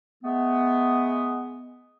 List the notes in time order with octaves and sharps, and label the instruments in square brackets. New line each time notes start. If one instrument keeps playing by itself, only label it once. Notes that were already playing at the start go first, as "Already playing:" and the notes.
[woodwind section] G#3 A3 B3